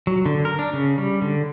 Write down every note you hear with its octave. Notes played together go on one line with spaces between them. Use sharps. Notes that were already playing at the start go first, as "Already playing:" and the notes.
F#3
D3
A#4
D4
C#3
G3
D3